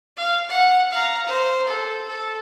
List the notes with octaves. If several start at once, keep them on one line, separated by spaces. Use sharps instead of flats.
F5
F#5
F5 A#5
C5
A4
A4